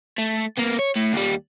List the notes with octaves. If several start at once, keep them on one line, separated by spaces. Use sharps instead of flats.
A3
A#3 B3
C#5
A2
D#2 G3